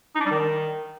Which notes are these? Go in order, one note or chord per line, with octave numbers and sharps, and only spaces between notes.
D#4
D4
G3
D#3